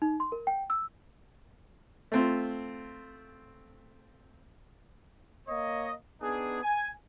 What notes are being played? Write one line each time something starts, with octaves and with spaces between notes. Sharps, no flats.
D#4
C6
A#4
G5
E6
A3 C4 F4
A#3 C#5 D#5
B3 D4 D#4 G#4
G#5